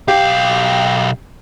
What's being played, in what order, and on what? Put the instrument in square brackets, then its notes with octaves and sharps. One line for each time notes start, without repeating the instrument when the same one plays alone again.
[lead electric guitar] B1 F5 [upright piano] G4